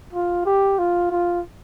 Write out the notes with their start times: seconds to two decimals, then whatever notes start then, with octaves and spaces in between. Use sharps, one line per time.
0.13 F4
0.46 G4
0.78 F4
1.11 F4